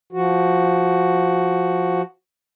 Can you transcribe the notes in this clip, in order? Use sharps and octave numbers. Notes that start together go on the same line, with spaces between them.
F3 F#4